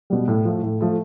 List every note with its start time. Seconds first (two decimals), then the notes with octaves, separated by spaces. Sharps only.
0.10 B2 G3
0.28 A2
0.45 F3 A3
0.63 A2
0.81 F3 A3